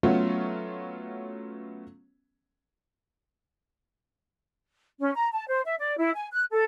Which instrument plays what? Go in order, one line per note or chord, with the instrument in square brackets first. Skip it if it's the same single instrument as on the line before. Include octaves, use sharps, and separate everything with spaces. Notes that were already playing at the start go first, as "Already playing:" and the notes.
[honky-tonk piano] F#3 A3 B3 C#4 F4
[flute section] C#4
A#5
A5
C5
E5
D5
E4
G#5
F#6
A4